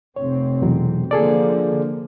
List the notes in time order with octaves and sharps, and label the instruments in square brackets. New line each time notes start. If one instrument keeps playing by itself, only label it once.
[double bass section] F1 C4 [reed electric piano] C#5
[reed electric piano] E2 B2 F#3
[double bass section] D3 F3 A#3 [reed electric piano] G#4 A4 D5